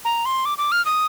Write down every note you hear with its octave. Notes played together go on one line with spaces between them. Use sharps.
A#5
C6
D6
D6
F6
D#6